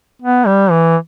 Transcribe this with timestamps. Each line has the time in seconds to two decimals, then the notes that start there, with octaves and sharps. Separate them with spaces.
0.22 B3
0.46 G3
0.71 E3